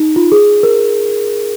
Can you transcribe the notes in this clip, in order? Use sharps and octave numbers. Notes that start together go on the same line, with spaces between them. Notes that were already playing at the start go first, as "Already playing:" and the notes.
Already playing: D#4
F4
G#4
A#4